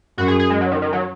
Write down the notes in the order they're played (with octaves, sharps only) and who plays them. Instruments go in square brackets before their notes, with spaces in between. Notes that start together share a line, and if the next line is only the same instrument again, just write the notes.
[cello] F#2 [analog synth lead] F#4
[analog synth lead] G#4
G#4
G#3
F#3
D#3
D#3
F#3